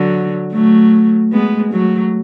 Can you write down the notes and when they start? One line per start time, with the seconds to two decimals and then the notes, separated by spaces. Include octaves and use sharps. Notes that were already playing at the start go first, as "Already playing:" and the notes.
Already playing: D3 F#3
0.53 F#3 A3
1.32 G#3 B3
1.72 F#3 A3